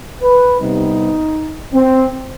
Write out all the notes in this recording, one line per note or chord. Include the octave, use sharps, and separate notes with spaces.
B4
C2 C3 G3 B3 D#4
C4